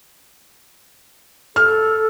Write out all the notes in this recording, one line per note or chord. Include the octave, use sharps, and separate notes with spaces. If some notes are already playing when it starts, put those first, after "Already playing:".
A4 F6